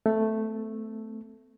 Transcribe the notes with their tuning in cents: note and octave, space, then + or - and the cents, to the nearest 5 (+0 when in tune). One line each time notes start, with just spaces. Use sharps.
A3 +0 C4 -40